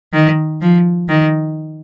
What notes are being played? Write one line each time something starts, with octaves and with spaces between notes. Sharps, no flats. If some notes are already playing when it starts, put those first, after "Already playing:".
D#3
F3
D#3